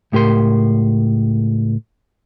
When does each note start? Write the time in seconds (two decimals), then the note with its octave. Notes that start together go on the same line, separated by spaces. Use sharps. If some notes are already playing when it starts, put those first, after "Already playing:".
0.12 C#2 A2 G4 A#4 C6